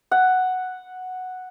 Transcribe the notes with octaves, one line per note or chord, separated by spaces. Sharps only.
F#5